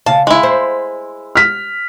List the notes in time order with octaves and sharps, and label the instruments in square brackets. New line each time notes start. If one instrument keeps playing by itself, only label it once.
[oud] C#3 F5 [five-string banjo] A5
[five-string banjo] G#3 E4
[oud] C5
[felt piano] F6 B6